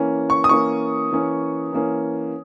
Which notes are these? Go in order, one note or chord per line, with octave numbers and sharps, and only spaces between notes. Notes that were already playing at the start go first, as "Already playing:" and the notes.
Already playing: E3 A#3 C#4
C#6
D#6
E3 A#3 C#4 C#6
E3 A#3 C#4
E3 A#3 C#4